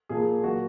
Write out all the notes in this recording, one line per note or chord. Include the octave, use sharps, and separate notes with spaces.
A#2 F3 A#3 G#4
A#2 F#3 A#3 F#4